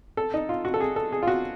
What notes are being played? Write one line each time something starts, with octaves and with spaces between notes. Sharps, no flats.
A4
D#4
F4
F#4
A4
G#4
A4
G#4
F4
F#4